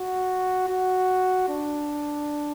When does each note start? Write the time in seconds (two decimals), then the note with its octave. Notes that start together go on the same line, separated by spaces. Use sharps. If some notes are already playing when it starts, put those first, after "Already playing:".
Already playing: F#4
0.69 F#4
1.49 D4